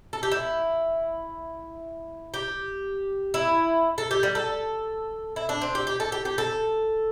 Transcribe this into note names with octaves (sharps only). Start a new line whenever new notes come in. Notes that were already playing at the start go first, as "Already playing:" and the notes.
A4
G4
E4
G4
E4
A4
G4
G3
A4
E4
D4
C4
G4
G4
A4
G4
G4
A4